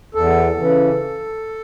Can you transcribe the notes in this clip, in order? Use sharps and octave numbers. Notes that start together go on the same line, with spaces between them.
E2 A4
C#3 E3